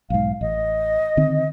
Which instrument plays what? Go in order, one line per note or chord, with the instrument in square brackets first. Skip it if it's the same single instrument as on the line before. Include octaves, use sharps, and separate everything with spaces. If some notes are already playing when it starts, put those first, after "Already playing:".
[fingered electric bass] B1 G#2 [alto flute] F5
[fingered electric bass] A1 [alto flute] D#5
[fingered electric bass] D3 D#3 C4